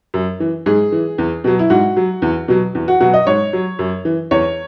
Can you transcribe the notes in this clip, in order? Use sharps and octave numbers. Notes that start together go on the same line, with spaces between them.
F#2
E3
G#2 G#4
E3
E2
B2 F#3
E4
G#2 F#4
F#3
E2
B2 F#3
E2
F#4
B2 F#3 F#4
D#5
G#2 C#5
F#3
F#2
E3
E2 C#5